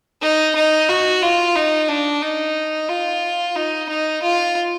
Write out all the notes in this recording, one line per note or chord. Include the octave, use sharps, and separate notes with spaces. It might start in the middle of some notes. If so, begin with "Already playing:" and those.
D#4
D#4
F#4
F4
D#4
D4
D#4
F4
D#4
D#4
F4